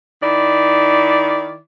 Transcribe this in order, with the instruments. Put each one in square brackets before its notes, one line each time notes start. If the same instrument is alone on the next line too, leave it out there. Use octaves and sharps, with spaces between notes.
[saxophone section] D#3 E4 D5